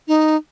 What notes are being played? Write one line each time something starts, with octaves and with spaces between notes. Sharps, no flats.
D#4